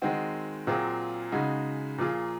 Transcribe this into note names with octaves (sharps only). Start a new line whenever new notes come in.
D#3 G#3 C4 F#4
A#2 F#3 C4 F4 G#4
C#3 G#3 D#4 F#4
A#2 F3 A#3 F4 G#4